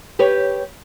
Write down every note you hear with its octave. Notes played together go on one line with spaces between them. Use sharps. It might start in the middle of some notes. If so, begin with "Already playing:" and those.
G4 B4 C#5